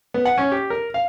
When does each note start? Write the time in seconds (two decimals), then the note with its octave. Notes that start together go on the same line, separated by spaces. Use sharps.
0.14 B3
0.25 F#5
0.38 C#4
0.52 G4
0.70 A#4
0.94 F5